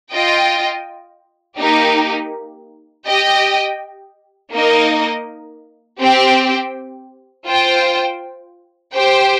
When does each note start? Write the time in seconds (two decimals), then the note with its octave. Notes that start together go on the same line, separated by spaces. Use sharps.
0.11 F4 D#5 G5
1.58 A#3 D#4 G4
3.06 G4 D#5 G5
4.52 A#3 D#4 A#4 D#5
6.00 C4 G4 C5 G5
7.47 F4 C5 G5
8.94 G4 C5 G5